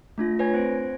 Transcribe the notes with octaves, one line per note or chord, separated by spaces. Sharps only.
A3 D4 F4 A#6
B4 C#5 G#5 G#6
C4 C5 A#6 D7